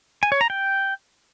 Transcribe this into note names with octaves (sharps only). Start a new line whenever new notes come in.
G#5
C#5
A#5
G5